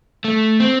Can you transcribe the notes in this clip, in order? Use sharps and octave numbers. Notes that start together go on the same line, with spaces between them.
A3
C4